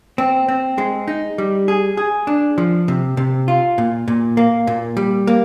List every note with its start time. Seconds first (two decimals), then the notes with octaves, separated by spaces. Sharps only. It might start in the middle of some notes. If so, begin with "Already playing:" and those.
0.18 C4
0.48 C4
0.78 G#3
1.08 D#4
1.38 G3
1.68 G#4
1.97 G#4
2.27 D4
2.58 F3
2.88 C3
3.17 C3
3.48 F4
3.78 A#2
4.08 A#2
4.37 A#3
4.67 A#2
4.97 G3
5.27 A#3